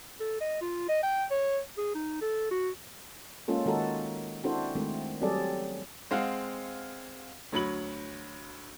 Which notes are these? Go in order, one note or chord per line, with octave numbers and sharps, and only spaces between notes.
A4
D#5
F4
D#5
G5
C#5
G#4
D#4
A4
F#4
G#3 A#3 C#4 F4 A4
D#3 G#3 D#4 F#4 A4 A#4
C4 D4 E4 F#4 A4 C5
D#3 G#3 A3 C4
F#3 G3 C4 G#4 A4 D5
G#3 C4 F5 F#5
D2 F#3 B5 F#7